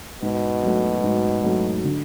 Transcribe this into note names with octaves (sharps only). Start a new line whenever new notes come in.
G#2 B2
F#3 A3
G#2
F#3 A3
D3